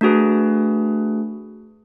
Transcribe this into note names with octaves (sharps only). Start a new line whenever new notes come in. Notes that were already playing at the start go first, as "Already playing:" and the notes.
A3 D4 F#4 G#4 B4